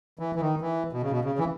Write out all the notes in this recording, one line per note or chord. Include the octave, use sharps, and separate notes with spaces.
E3
E3
D#3
E3
B2
C#3
B2
C#3
E3